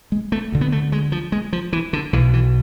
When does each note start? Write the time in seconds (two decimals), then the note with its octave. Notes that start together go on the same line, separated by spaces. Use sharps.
0.12 G#3
0.32 A3
0.52 D2 D3
0.61 B3
0.72 A3
0.92 G#3
1.12 F3
1.32 G#3
1.53 F3
1.73 E3
1.93 D3
2.13 B1 B2 E3
2.33 E3